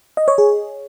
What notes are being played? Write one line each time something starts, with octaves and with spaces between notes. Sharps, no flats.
D#5
C#5
G#4